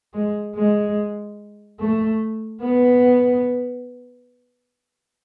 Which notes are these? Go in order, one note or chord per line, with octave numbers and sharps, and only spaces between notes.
G#3
G#3
A3
B3